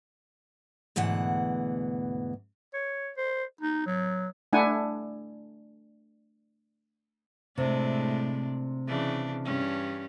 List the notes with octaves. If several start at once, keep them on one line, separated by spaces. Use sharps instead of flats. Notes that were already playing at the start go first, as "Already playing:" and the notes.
D2 G#2 B2 E3 F#5
C#5
C5
D#4
F#3
A3 D4 E4 F#5 G#5
A2 C3 G#3 D4
C#3 E3 D4
G2 C#4